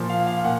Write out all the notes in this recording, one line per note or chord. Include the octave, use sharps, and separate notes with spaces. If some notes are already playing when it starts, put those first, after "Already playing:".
Already playing: A#2 F3
F5
F5
A#2 F#5